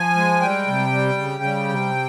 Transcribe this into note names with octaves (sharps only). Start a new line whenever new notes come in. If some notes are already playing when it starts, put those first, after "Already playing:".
Already playing: F3 G#5
G#3
G3 G5
C3
G3
C#3
G3
C3